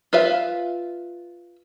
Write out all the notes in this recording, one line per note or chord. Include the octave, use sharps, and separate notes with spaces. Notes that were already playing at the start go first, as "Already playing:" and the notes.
F4 B4 E5 F5